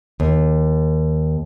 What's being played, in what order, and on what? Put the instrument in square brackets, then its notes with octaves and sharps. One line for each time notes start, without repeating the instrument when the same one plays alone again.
[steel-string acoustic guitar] D#2